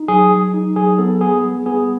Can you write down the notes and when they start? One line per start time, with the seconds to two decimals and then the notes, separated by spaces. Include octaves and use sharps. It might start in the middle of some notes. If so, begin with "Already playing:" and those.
Already playing: D#4
0.08 F#3 G#4
0.31 F#3
0.54 D#4
0.76 F#3 G#4
0.98 B3 A4
1.21 B3 G#4
1.44 G3
1.66 B3 G#4